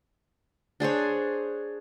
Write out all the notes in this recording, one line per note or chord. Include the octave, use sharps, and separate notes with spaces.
D4 G#4 C5 C#5